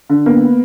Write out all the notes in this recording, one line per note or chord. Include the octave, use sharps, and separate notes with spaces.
D3
A#3 B3